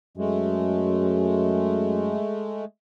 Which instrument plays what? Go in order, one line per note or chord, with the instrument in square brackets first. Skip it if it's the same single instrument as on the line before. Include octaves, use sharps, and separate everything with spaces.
[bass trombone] F#2 [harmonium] G#3 A3